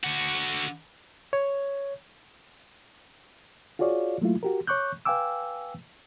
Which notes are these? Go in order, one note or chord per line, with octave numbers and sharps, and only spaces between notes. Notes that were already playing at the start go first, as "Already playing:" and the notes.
D3 F#4
C#5
F4 F#4 G#4 C#5 D5 F5
F#3 A3 A#3 E4 F4
F#4 G4 A#4
C#5 C#6 D6 F#6 G6
B4 F5 G5 G#5 D6 E6